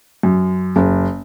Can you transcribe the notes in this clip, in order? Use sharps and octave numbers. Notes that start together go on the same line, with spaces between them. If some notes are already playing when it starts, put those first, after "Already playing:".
F#2
F#1